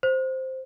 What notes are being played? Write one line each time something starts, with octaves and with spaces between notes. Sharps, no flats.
C5